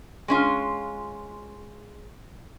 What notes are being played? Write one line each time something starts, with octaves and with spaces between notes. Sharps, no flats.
G#3 C#4 F4